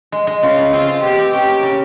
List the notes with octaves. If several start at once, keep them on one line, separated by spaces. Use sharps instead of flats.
G#3
G#3
C#3 F4
C#3
C4 F4
G#3
B2 G4
C4
C#4 G4
A#3
C#3